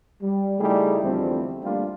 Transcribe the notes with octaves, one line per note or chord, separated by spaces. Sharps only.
G3
C#3 G3 A3 D#4 E4 G#4
E2 D3 F3 G3 A3 C4
G3 A3 A#3 D4 F4